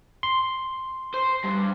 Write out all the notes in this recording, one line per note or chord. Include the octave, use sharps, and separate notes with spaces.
C6
C5
G2